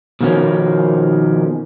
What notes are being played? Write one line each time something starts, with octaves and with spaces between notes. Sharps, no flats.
B2 D#3 F3 A#3 C#4